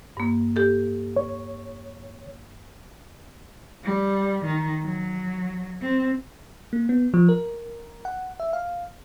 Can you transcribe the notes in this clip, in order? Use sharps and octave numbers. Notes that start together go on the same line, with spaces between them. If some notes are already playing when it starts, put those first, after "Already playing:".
G2 A#3
G4 A4
C#5
G3
D#3
F#3
C4
A#3
B3
F3
A#4
F#5
E5
F5